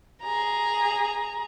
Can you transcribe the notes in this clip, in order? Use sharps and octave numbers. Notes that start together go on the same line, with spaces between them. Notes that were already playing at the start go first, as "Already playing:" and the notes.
G#4 A#5